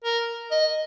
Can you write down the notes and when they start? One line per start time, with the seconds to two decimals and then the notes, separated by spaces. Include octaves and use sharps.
0.04 A#4
0.51 D#5